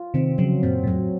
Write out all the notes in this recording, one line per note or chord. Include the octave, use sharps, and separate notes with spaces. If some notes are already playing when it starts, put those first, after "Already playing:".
Already playing: F4
C3 D#3 C4
C#3 F3 F#3
F#2 A#2 C4
A#2
F2 A2 F#3